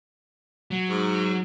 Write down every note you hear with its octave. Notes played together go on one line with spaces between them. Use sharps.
F#3
G#2